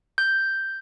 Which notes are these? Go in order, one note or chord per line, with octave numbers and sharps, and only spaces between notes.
G6